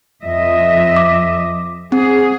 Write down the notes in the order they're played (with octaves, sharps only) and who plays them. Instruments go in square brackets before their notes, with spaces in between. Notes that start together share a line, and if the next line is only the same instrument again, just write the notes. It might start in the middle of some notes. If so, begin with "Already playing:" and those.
[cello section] F2 D#5 E5
[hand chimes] D6
[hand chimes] C4 [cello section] G#4